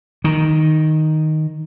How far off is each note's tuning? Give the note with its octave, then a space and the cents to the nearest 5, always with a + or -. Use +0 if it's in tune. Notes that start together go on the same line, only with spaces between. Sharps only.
D#3 +0